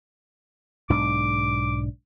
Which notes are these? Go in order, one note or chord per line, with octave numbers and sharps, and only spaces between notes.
B1 G#2 D4 D6